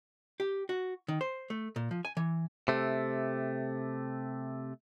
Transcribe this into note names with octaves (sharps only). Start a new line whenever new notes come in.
G4
F#4
D#3
C5
A3
A#2
F3
G#5
E3
C3 A3